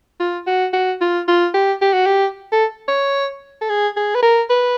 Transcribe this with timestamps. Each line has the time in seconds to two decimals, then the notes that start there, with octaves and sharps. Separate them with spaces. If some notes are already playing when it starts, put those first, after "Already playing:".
0.20 F4
0.47 F#4
0.73 F#4
1.01 F4
1.28 F4
1.54 G4
1.82 G4
1.93 F#4
2.06 G4
2.52 A4
2.88 C#5
3.61 A4
3.69 G#4
3.96 G#4
4.15 B4
4.23 A#4
4.50 B4